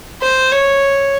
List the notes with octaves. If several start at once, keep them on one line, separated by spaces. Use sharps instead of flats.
C5
C#5